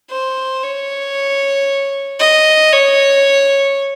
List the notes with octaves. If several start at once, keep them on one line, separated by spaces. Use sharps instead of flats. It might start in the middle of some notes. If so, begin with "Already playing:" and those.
C5
C#5
D#5
C#5